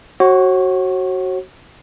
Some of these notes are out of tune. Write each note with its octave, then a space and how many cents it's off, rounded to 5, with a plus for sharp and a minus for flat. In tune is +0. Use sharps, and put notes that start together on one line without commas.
F#4 +15 C#5 -40